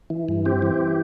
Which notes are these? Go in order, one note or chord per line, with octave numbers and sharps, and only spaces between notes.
E3
G2
C4 G4
E3